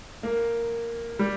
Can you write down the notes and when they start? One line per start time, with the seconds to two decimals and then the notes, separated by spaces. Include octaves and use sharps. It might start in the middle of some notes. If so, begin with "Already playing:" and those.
0.23 A#3
1.19 G3